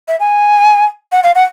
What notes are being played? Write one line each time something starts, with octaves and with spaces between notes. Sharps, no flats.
E5
G#5
F#5
F5
F#5